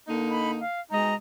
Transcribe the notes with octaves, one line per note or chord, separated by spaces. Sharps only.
D3 A#3 D#4
B5
F5
B2 G#3 D#4 D#5 A#5